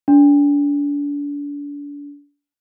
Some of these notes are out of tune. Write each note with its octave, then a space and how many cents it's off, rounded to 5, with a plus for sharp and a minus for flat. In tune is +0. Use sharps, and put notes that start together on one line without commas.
D4 -35